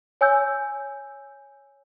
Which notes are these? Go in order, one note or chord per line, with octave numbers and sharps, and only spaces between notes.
C#5 G#5 E6 G6